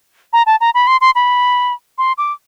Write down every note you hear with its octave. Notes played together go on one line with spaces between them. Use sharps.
A#5
A5
A#5
B5
C6
C6
B5
C6
D6